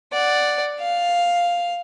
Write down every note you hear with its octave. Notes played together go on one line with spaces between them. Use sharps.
D5 F#5
F5